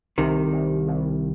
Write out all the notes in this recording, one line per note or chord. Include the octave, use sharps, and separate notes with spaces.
C2 C3 D#3
C2
C2